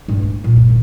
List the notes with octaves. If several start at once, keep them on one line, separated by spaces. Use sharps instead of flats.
G2
A#3
A#2
G2
D#3